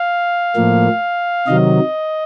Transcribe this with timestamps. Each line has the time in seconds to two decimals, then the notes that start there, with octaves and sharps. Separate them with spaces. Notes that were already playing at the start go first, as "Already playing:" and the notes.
Already playing: F5
0.56 A2 F3 A#3
1.47 C3 D#3 F#3 D#5